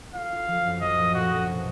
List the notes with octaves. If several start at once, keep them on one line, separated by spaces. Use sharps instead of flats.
F4 F5
F4
F3
F#2
F3 D#5
A#2
A#2 F#4
A#1
B2